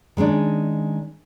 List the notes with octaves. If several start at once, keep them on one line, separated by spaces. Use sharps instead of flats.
D#3 G#3 C#4 D4